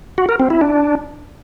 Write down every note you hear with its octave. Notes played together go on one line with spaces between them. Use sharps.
F#4
A#4
C4
E4
D4